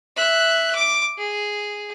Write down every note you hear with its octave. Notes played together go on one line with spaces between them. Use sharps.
E5 F#6
D6
G#4